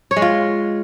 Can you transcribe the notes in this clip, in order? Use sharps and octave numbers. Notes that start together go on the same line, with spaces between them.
C#5
G#3
F4